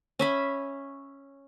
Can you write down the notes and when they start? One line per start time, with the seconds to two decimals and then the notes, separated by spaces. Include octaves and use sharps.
0.19 C#4 E5 B5